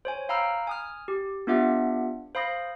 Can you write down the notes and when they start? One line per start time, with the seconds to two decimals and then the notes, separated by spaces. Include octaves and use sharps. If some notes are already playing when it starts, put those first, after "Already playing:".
0.05 C5 C#5 G#5
0.29 F5 G5 A#5 B5 E6 F6
0.67 G#5 D#6 F6
1.08 G4
1.47 B3 D4 F4 G4 E5 F#5
2.35 C5 F5 B5 D#6 A#6